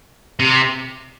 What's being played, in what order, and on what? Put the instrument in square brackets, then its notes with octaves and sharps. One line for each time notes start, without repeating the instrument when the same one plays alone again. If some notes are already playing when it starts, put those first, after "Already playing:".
[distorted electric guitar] C3